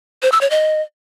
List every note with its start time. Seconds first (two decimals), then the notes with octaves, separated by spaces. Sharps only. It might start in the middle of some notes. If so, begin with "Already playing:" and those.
0.23 C5
0.32 E6
0.41 C#5
0.51 D#5